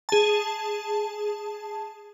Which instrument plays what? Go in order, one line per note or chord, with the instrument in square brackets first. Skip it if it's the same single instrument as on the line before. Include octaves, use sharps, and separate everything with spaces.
[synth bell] G#4 A5